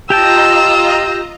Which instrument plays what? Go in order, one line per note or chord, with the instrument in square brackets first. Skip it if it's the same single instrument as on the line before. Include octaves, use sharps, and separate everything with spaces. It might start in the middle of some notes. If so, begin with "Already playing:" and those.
[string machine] F4 D#5 A#5 [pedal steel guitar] G4 G5 A5 [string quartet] E6